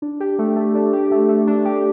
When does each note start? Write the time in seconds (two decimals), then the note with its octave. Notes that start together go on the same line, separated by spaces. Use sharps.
0.02 D4
0.20 G4
0.39 A3
0.56 A3
0.75 D4
0.93 G4
1.11 A3
1.29 A3
1.47 D4
1.65 G4